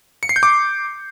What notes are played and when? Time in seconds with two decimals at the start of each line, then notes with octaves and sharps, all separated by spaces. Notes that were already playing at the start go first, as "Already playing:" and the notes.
0.23 C#7
0.29 C7
0.36 G6
0.43 D6